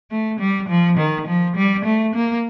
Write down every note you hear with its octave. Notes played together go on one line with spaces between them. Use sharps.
A3
G3
F3
D#3
F3
G3
A3
A#3